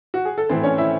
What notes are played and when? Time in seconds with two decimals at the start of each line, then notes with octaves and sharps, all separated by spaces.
0.14 F#4
0.25 G#4
0.38 A4
0.49 A2 E3 A3 C4 C5
0.63 C#4 C#5
0.78 E4 E5